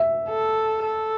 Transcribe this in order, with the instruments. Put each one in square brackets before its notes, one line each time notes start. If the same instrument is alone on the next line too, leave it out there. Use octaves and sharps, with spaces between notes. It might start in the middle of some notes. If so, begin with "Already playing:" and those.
Already playing: [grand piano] E5
[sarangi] A4
A4